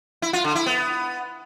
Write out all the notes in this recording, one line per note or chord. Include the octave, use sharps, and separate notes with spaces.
E4
F4
D3
E4
B3